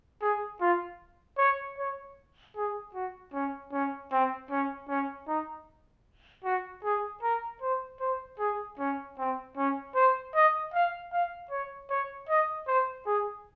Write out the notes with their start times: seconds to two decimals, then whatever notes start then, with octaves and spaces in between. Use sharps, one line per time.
0.22 G#4
0.61 F4
1.38 C#5
1.78 C#5
2.56 G#4
2.94 F#4
3.33 C#4
3.73 C#4
4.12 C4
4.51 C#4
4.89 C#4
5.28 D#4
6.45 F#4
6.84 G#4
7.22 A#4
7.62 C5
8.00 C5
8.39 G#4
8.79 C#4
9.18 C4
9.57 C#4
9.95 C5
10.35 D#5
10.74 F5
11.13 F5
11.51 C#5
11.90 C#5
12.29 D#5
12.67 C5
13.06 G#4